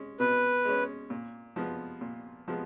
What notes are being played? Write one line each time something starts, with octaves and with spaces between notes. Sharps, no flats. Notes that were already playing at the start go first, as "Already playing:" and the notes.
Already playing: G#3 C#4
B2 B4
G#3 C#4
A#2
F3 G#3 B3
A#2
F3 G#3 B3